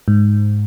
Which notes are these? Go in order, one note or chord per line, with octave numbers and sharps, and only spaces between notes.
G#2